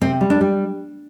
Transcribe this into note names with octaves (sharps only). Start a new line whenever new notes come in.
C3 C4
G3
D4
G3